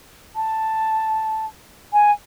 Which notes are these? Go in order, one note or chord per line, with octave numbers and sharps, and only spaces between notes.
A5
G#5